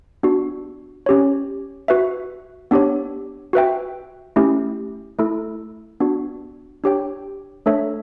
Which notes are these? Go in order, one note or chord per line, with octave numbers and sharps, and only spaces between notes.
B3 D4 F#4
C#4 G4 C#5
F#4 B4 E5
B3 D4 G4 C#5
F#4 B4 E5 G5
A3 C#4 E4 G4
A3 E4 A4
B3 D4 F#4
D4 G4 C#5 G5
A3 D4 A4 C#5 E5